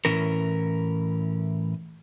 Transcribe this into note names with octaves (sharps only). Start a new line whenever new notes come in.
A2 E3 C#4 A#4